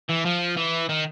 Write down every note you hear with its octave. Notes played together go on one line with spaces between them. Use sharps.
E3
F3
E3
D#3